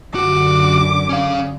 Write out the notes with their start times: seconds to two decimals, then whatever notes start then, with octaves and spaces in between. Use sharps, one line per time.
0.15 F#2 D3 F#4 G4 D6
1.09 C#4 F5